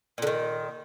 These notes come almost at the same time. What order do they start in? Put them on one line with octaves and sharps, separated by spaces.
A#2 D3 D#3